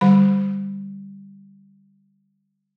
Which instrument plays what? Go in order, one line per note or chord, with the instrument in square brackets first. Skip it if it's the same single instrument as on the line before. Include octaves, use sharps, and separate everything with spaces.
[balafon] D3 G3 B5